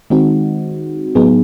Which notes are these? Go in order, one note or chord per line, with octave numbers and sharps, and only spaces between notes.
D#3 G#3 C4 D#4 F#4
A2 F#3 B3 D#4 G#4